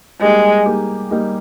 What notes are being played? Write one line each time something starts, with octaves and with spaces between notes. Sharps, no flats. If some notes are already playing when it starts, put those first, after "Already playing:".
G3 G#3 A#3 D#4 G4
G3 A#3 D#4 G4
G3 A#3 D#4 G4